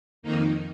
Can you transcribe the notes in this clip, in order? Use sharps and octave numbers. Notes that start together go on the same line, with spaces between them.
F2 D#3 A#3 D#4